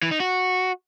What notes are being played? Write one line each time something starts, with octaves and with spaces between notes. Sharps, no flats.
E3
D#4
F#4